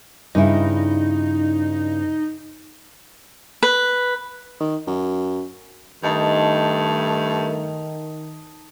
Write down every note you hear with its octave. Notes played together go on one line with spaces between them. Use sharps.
G2 C#3 D#4 E4
B4
D#3
F#2
G2 D#3 A3 D#4 A5